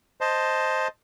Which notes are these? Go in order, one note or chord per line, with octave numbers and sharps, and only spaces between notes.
C5 D#5 A5